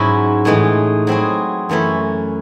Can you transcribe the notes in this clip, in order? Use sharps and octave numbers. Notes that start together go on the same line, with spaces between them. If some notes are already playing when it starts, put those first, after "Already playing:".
Already playing: G#2 F#3 C#4 E4
A2 E3 G#3 D#4
F#3 C4 E4 G#4
F#2 E3 A3 C#4 E4